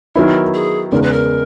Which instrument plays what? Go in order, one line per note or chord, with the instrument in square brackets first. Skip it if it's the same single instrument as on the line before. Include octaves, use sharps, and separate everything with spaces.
[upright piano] D#3 F#3 B3 E4 [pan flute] A#4
[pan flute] G#4
[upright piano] E2 C#3 G#3 B3 D#4 [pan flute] A#4
[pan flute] B4
A#4